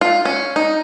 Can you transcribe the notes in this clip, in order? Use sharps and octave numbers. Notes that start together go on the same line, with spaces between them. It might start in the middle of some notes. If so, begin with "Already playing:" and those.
F4
C#4
D#4